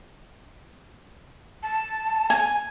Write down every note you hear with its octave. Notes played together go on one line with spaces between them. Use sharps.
A5
G#5